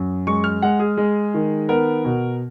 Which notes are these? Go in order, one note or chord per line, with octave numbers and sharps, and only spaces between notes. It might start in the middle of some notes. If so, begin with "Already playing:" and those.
Already playing: F#2
G#3 C#6
F6
G#3 F#5
G#4
G#3
D#3
B3 A#4
B2